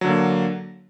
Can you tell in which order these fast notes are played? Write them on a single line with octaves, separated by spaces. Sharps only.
F#3 D3 A#3